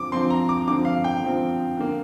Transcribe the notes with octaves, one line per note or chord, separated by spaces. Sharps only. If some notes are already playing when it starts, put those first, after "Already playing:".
Already playing: D3 F3 C4 D6
D3 F3 C4 C6
A#5
D6
D3 F3 C4 D6
F5
G5
D3 F3 C4
D3 A#3